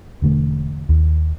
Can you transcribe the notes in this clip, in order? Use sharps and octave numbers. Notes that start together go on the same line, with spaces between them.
E1 D3 A3
D#2